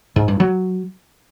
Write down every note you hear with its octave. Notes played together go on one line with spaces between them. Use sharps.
G#2
G2
F#3